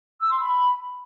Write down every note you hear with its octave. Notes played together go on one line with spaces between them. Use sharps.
E6
C6
B5